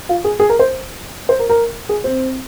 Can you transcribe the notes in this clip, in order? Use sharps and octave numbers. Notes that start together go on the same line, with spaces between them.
F4
G#4
G#4
A#4
C5
C5
A#4
A#4
G#4
C4